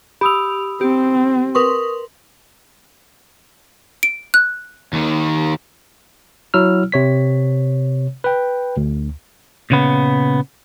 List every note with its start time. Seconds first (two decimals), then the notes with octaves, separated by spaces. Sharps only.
0.21 G4 B5 D#6 E6 F7
0.81 C4 G4
1.55 A#4 B4 C6 C#6 D#6
4.03 D7
4.34 F#6
4.93 D#2 D#3
6.54 F#3 E4 E6 F6
6.92 C3 C#5 B6
8.24 B4 G5
8.77 D2
9.70 A#2 C#3 B3